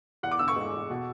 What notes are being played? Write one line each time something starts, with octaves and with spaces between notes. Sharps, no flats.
E2 F#5
D6
D3 E6
C#6
G#3
E2
B2